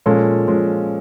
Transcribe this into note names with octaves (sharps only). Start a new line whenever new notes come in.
A#2 F3 G#3 C#4 A4
A#2 F3 G#3 C#4